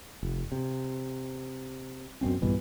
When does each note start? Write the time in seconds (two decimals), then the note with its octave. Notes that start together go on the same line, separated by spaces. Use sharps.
0.23 F1
0.52 C3
2.21 F#2 B2 C4 C#4
2.42 A#1 G2 B2 E3